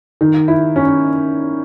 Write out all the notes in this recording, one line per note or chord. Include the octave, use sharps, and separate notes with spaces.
D#3
E4
C#4